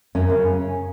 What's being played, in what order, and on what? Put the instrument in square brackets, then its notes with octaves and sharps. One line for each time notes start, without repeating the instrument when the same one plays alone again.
[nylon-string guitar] F#2 C#4
C#3